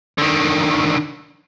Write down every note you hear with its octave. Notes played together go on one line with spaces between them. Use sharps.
D3 D#3